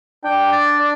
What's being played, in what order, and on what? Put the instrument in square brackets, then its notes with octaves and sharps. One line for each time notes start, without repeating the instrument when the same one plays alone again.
[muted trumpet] D4 [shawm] G5
[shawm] D5
D5